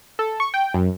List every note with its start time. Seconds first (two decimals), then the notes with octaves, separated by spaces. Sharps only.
0.19 A4
0.40 C#6
0.54 G5
0.74 F#2